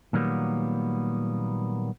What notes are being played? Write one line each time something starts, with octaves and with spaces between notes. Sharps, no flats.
A#2 D#3 F#3 G3 A#3 B3